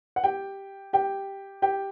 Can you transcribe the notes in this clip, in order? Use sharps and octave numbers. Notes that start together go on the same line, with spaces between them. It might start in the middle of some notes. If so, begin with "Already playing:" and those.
F#5
G4 G5
G4 G5
G4 G5